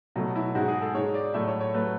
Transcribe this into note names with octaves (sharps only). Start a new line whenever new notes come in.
B2 F#3 A3
E4
G#2 G#3 F#4
G#4
A4
G#2 G#3 C#5
D5
A2 F#3 A3 E5
C#5
C#5
F#3 A3 B4